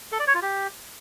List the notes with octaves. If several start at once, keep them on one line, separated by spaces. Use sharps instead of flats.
A4
D5
C#5
F4
G4